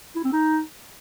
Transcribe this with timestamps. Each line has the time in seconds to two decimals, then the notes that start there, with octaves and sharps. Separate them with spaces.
0.16 E4
0.24 C4
0.33 D#4